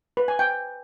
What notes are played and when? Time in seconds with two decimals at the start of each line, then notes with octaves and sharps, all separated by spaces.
0.17 B4
0.28 G#5
0.39 G5